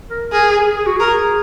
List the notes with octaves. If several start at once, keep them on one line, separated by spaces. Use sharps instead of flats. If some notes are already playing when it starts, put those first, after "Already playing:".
A#4
G#4 A#4
G#4
G#4
F#4
G#4 A#4